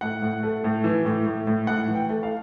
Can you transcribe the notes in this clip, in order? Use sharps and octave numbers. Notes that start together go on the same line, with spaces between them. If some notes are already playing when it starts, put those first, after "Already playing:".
A2 F#5
A2
A3
A2
E3
A2
A2
A2
A2 F#5
E3
G5
A3
F5